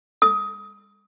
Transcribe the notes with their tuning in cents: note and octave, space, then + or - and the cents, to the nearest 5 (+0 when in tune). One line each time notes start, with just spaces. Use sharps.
D#6 +20